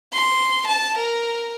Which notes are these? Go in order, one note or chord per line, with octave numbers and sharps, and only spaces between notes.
C6
A5
A#4